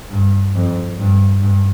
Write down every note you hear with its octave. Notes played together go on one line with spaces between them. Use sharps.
G2
F2
G2
G2